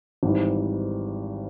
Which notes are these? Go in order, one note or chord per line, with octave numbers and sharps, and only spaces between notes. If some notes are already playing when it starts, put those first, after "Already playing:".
G#1 G#2 E3 G3